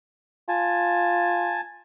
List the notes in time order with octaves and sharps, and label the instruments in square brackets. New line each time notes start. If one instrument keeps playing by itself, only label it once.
[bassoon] F4 [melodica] G#5 A5